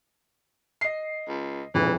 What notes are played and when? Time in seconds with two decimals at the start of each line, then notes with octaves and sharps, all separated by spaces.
0.81 D#5 C7
1.28 C#2
1.74 E1 A#1 F2 E3